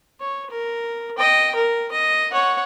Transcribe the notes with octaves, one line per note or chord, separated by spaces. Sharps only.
C#5
A#4
D#5 G5
A#4
D#5
C#5 F#5